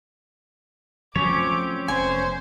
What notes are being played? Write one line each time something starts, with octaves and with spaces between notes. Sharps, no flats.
F3 F#3 A3 C4 C#4 C#5 D6
F1 E2 C5 G#5